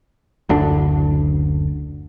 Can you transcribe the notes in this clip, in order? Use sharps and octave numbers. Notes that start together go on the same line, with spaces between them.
F#1 D2 D3 D4